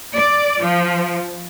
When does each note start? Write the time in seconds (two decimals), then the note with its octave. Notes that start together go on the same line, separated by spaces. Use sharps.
0.16 D5
0.61 F3